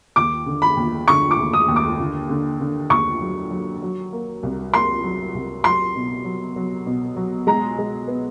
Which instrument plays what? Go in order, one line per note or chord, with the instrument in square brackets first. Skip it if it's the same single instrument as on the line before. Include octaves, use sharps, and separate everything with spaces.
[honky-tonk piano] D#2 [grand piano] D6
[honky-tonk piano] D3
[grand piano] B5
[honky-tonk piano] D#2
[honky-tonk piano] D3 [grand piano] C#6
[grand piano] D6
[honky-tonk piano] D#2
[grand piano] D#6
[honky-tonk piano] D#2
[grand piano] D6
[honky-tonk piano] D3
D3
D3
[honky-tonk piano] D#2 [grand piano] C#6
[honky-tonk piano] F#3
F#3
F#3
A#3
C2
[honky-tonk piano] A#3 [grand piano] C6
[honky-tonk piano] F#3
C2
[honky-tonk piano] F#3 [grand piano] C6
[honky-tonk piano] B2
F#3
F#3
B2
F#3
[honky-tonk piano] G#3 [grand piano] A#5
[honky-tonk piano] G#3
B3